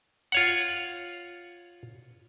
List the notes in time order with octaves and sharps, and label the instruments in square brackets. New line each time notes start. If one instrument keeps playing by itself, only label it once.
[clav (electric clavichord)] F4 C#5 F#5